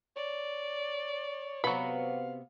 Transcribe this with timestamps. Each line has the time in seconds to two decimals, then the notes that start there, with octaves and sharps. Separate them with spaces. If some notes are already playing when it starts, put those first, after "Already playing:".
0.16 C#5 D5
1.64 C3 F#3 B3 F#4 F5 B5